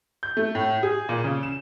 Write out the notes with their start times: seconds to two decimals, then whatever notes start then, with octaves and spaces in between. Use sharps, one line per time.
0.23 G6
0.37 A3
0.55 A2
0.83 G#4
1.09 A#2
1.24 C#3
1.43 E7